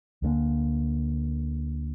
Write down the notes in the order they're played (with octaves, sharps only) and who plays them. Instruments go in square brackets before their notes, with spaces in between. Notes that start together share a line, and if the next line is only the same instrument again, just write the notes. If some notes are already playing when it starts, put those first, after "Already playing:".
[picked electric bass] D2 D3 G3 A#3